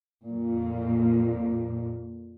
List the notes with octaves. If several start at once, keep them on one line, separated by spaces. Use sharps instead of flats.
F2 A#2